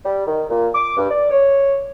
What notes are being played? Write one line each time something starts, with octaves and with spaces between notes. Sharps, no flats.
G3
D#3
A#2
D6
G2
D5
C#5